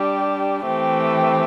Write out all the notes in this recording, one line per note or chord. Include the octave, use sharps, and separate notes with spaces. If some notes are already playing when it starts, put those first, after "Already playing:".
Already playing: G3 D4 G4
E3 A3 C4 G4